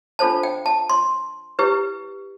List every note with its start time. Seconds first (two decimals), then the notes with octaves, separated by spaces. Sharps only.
0.19 D4 F4 A4 C5 A5
0.43 G5
0.66 A5
0.90 C6
1.59 E4 G4 B4